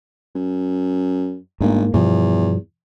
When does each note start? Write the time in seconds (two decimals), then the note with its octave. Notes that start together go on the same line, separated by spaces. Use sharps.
0.35 F#2
1.61 G1 G#2 A#3
1.94 E2 G2 B2 F3